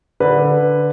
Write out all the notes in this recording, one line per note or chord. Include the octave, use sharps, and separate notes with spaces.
D3 B4